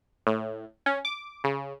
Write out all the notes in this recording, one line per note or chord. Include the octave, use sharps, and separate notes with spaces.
A2
C#4
D6
C#3